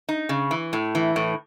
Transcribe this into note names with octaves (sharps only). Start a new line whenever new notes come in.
D#4
C#3
E3
A2
E3
A2